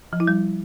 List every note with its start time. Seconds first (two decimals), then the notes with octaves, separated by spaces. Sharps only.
0.13 F3
0.20 E4
0.27 G3